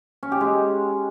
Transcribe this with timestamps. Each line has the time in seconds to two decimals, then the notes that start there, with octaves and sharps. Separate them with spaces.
0.23 C#4
0.32 G4
0.41 G#3